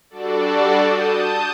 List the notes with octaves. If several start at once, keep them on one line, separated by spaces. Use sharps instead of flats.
G3 D4 F#4 A4 D5
A5 D#6 G6